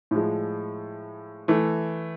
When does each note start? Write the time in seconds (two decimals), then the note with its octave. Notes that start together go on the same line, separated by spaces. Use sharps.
0.11 A2 F3 G#3
1.48 E3 A3